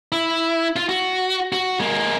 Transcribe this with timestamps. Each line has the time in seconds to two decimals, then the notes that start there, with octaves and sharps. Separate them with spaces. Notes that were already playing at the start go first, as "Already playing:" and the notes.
0.12 E4
0.76 F4
0.89 F#4
1.52 F#4
1.80 G#3 A#3